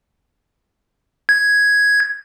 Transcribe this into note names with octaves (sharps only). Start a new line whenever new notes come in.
G#6